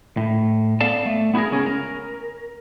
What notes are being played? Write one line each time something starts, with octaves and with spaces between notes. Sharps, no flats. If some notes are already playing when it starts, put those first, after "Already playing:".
A2
B3 A4 D5 F5 A5
A3
B3 E4 F#4 G#4 A#4
C#2 C#4 G#4 A#4
A#4